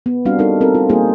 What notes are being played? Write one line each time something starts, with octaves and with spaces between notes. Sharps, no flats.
B3
G3 C4 D4 F#4 F5
G3 D#4 A4 A#4
C4 F#4 A4 A#4
F4
G3 A#3 D#4 F4 G#4 C5